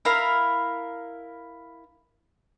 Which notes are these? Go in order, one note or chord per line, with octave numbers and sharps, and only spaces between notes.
E4 A#4 F5